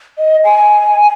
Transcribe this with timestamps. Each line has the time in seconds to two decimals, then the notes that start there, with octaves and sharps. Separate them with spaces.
0.18 D#5
0.44 G#5